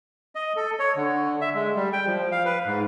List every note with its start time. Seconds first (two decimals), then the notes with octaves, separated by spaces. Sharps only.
0.35 D#5
0.56 A4
0.79 C#5
0.96 D3
1.41 E5
1.55 G#3
1.75 G3
1.93 G5
2.06 F3
2.32 F5
2.45 B4
2.66 G#2